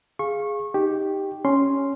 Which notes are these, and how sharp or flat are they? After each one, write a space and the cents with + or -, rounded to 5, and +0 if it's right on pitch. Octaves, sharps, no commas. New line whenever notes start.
G#4 +0 F5 +0 C#6 -25
D#4 +0 G4 +0
C#4 +0 C6 +0